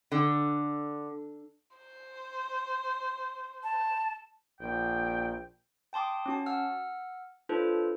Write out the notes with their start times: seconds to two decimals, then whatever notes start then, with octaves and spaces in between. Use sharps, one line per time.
0.12 D3
1.77 C5
3.63 A5
4.60 A#1 G5
5.93 G5 A5 C6 D6 D#6
6.26 C#4 F#4 A5
6.46 F#5 E6 F6
7.49 D4 F4 A4 B4 C5